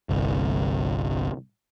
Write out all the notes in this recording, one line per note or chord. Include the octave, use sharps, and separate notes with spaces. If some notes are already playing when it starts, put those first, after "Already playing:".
G1 C2